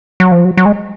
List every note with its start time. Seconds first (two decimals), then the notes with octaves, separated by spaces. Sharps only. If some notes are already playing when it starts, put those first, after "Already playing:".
0.20 F#3
0.32 F3
0.45 F#3
0.57 F#3
0.66 G#3